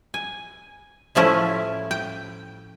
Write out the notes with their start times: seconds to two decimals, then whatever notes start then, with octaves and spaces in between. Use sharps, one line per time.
0.14 G#5
1.15 A2 F3 A3 C#4 E4
1.91 G5